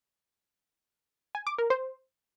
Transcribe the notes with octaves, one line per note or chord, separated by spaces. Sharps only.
G#5
D6
A#4
C5